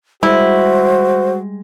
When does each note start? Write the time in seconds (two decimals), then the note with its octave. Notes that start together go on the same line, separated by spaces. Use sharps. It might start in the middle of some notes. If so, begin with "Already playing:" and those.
0.23 G3 G#3 E4 F#4 C5